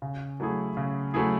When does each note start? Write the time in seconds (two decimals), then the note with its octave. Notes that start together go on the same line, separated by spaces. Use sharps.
0.02 C#3
0.40 F#3 A3 E4 G#4
0.77 C#3
1.14 F#3 A3 E4 G#4